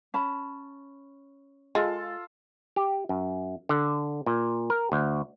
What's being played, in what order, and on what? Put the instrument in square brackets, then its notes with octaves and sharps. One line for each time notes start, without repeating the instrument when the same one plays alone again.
[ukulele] C#4 A5 B5
[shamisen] G#3 [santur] F4 A4
[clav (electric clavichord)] G4
F#2
D3
A#2
A#4
D2